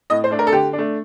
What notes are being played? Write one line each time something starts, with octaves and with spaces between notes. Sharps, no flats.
A2 D#5
C5
A3 D4
A#4
A4
D3 G4
D4
A3